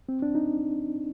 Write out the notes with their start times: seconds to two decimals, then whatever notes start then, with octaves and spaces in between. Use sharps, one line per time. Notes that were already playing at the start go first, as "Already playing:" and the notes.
0.09 C4
0.22 D4
0.35 D#4